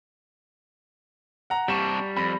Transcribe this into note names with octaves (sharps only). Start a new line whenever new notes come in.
F#5 A#5
C3 G3 D4 C#6 E7
F2 B5